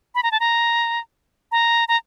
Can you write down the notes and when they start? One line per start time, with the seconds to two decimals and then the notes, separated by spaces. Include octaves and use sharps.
0.15 B5
0.23 A#5
0.32 A5
0.40 A#5
1.52 A#5
1.88 A#5